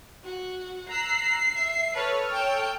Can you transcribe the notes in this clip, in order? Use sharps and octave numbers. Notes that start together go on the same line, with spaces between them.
F#4
A#5 E6 F#6 C7
E5
A4 B4 C#5 F6
G5 A5